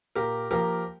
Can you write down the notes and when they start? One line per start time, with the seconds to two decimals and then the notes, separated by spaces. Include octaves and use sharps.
0.15 A#2 G4 A#4
0.51 F3 A#3 G4 A#4